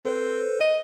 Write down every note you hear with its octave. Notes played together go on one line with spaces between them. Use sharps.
C4 A4 B4 C5
D#5